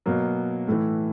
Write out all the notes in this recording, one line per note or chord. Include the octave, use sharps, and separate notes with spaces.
B2 F#3 A#3
A2 E3 A3